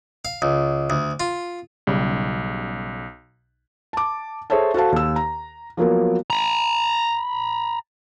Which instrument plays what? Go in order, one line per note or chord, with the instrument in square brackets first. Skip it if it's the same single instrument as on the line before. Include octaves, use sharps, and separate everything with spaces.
[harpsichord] F5
C#2
D2
F4
[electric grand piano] B1 [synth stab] C#3 G3
[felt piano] A5 D6
G#4 A4 C5 C#5 E5 A5
F#4 A4 C5 F5 A5
D#2 E6
A#5
F3 F#3 A#3 B3 A#4
[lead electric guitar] A#5 B5